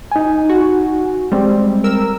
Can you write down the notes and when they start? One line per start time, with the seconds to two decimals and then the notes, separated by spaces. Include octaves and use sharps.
0.12 D#4 G#5
0.50 F#4
1.32 G3 G#3 C4
1.84 A#4 E6